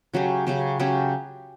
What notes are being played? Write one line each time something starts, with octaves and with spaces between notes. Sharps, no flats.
C#3 F#3 C#4 G4
C#3 F#3 C#4 G4
C#3 F#3 C#4 G4